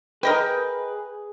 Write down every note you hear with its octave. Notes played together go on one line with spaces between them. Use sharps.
G#4 A#4 B4 D#5 G5